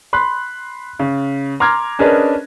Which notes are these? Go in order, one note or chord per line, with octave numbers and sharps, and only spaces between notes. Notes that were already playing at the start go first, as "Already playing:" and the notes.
B5 C6 F#6
C#3
A#5 C6 D6 F6 G#6
C#4 D4 G#4 A#4 B4 D#5